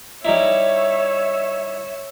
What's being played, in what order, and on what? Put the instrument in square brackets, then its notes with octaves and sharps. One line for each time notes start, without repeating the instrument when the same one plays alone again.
[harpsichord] G3 D#4 E4 [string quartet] C#5 E5 E6